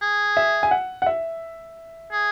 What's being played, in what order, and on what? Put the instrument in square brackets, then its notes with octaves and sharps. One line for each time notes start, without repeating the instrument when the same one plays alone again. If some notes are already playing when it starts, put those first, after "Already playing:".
[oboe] G#4
[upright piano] E5
G#5
F#5
F#5
E5
[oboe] G#4